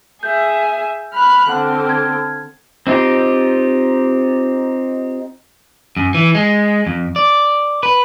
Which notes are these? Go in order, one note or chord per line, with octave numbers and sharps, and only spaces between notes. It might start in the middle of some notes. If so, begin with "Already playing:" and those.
G#4 E5 G6
B5 F6 F#6
D3 C4 F#5 F6
F6 G#6
C4 D#4 F4 G4
F#2
E3
G#3
F2
D5
B4